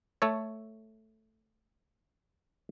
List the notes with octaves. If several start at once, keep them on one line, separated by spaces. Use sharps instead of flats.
A3 A4 C#5